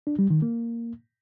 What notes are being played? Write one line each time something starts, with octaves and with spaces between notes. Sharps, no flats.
D4
G3
D#3
A#3